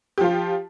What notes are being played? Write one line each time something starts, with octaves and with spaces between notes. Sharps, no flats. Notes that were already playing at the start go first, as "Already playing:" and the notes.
F3 F4 G4